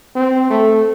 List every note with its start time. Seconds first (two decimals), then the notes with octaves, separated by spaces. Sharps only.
0.15 C4
0.50 A3